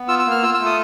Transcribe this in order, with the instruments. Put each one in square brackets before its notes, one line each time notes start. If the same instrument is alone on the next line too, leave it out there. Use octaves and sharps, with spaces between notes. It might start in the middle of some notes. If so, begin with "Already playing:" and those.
Already playing: [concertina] B3
F4 E6
E6
A#3
F6
F4 E6
E6
A3
D#6